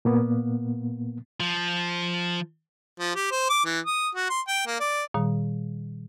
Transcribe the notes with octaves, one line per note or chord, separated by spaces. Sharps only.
A#2 A#3 B3
F3
F3
G4
C5
D6
E3
D#6
F#4
C6
G5
A#3
D5
A#2 D#3 G3